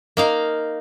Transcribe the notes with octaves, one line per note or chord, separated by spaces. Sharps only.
A#3 D#4 F5